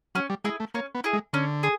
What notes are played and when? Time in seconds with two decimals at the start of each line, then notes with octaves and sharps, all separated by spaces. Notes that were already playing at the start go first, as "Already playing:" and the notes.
0.15 F#3 C#4
0.30 G3
0.44 G#3 E4 G#4
0.60 A3
0.74 A#3 C#4
0.95 B3
1.04 E4 G#4
1.13 G#3
1.33 D3 C#4
1.63 G#4